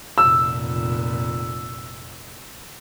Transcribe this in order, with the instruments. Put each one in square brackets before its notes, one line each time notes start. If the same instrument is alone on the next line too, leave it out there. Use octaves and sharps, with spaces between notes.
[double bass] F1 A#2 [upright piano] E6